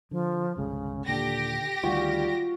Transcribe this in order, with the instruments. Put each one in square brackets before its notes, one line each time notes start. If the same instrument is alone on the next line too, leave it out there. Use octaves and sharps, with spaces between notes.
[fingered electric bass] D3 [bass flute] F3
[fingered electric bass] G1 C2 G#3 [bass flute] C#3
[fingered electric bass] D#2 A#2 [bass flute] D3 [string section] G4 A#6
[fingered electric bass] D2 D#3 [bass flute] G3 [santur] F4 F#4